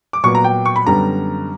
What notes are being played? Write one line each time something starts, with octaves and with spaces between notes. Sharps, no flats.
D6
A#2 F#3 B3 C#6
A#5
G5
C#6
B5
F#2 D3 G3 B3 A#5